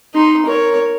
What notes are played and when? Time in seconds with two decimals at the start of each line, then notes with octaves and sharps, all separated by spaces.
0.14 D#4 C6
0.46 A#4 C#5